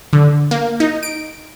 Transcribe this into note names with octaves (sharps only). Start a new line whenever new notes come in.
D3
A#3
D#4
D7